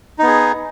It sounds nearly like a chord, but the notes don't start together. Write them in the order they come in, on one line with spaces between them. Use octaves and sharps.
D#4 B3 G#4